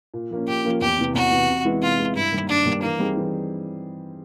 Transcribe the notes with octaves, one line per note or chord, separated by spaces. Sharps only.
A#2
F3 A#3 C#4
A#2 G4
F3 A#3 C#4
E2 G4
C3 E3
E2 F#4
C3 E3
C3
E3 G#3 B3 E4
C3 F4
E3 G#3 B3 E4
G2 E4
D#3 G3 A#3
G2 D4
D#3 G3 A#3
E3 A#3
G3 C4 D#4 G#4
E3